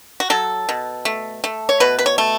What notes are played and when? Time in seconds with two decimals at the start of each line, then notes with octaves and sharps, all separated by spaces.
0.20 F#4
0.30 F#3 A4
0.69 B2
1.05 A3
1.44 A3
1.69 C#5
1.80 B2 B4
1.99 B4
2.06 C#5
2.18 A3